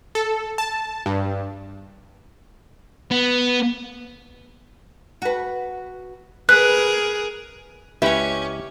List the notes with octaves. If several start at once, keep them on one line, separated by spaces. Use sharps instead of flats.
A4
A5
G2
B3
F#4 B4
G#4 A#4 B4 F#6
C#2 C#4 E4 G4 B4 C#5 E5